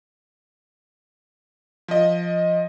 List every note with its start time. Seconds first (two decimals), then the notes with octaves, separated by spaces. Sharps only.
1.88 F3 D#5